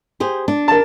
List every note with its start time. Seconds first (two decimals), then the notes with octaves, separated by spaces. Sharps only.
0.20 G4 G#4 C5
0.48 D4
0.68 A#4 A5